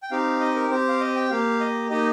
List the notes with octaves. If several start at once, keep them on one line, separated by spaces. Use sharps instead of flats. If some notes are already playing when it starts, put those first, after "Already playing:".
G5
C4 D#4 G4 F5
D#5
A#4
C4 G4 C5
F5
D#5
G5
A#3 G4 F5
D#5
A#3 D#4 G4 D#5